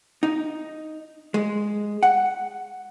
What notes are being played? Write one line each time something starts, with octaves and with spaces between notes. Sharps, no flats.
D#4
G#3
F#5